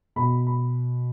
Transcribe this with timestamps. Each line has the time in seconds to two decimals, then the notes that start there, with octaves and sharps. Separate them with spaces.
0.16 B2 B5
0.47 B5